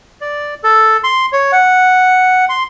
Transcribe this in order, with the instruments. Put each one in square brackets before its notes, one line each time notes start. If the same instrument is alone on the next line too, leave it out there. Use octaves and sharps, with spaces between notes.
[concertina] D5
A4
C6
C#5
F#5
C6